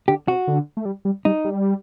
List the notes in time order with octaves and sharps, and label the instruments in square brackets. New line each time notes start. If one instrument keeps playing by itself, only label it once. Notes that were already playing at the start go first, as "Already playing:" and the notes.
[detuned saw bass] D3 [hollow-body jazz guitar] G4
[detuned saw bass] C3 [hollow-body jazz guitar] F#4
[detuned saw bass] D3
A3
G3
G3
[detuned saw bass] G3 [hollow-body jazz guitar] D#4
[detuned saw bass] G3